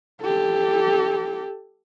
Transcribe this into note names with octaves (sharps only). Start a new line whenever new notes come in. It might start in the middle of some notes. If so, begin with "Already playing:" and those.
G4 A4